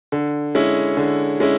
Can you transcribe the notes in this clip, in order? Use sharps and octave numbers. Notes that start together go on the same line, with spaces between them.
D3
G#3 C#4 E4
D3
G#3 C#4 E4